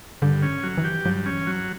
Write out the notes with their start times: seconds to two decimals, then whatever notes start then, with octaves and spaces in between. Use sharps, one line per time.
0.22 G2 D3
0.42 C#4
0.63 F#3
0.78 E3
0.84 G4
1.05 G2 F#3
1.26 C#4
1.33 E3
1.47 F#3